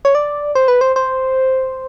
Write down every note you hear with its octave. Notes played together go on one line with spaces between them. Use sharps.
C#5
D5
C5
B4
C5
C5